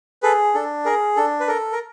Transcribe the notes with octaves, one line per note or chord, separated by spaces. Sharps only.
G#4 A4 B4
D4 A4
G#4 A#4
D4 A4
B4
A4 A#4
A#4